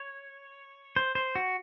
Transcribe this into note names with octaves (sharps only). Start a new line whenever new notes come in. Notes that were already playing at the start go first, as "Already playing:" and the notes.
Already playing: C#5
C5
C5
F#4